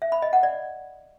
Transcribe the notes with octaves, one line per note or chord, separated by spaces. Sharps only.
E5
B5
D#5
F#5
D5